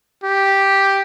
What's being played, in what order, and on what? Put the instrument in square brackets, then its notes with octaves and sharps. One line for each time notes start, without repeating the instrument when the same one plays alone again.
[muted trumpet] G4